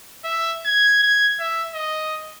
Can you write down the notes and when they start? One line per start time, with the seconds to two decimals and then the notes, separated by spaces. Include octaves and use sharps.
0.24 E5
0.65 G#6
1.03 G#6
1.40 E5
1.74 D#5